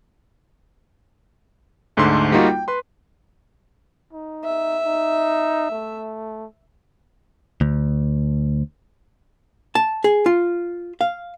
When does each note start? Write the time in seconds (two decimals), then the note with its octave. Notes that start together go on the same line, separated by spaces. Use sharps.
1.97 D2 G#2 D3 A3 C6
2.32 G3 A#3 D#4 F4 F#4
2.47 G5
2.68 B4 C6
4.13 D#4
4.44 E5
4.86 D#4
5.71 A3
7.61 D2
9.75 A5
10.04 G#4
10.26 F4
11.01 F5